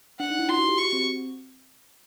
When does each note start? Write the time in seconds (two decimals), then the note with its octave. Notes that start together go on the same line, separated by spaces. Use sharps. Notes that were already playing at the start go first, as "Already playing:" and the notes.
0.20 D4 F#5
0.30 D#4
0.39 E4
0.48 F4 C6
0.58 F#4
0.69 G4
0.77 F#4 C#6
0.93 C4